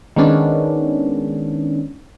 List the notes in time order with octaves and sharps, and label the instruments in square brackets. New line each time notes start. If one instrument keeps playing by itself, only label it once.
[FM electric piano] D#3 G#3 B3 C#4 D4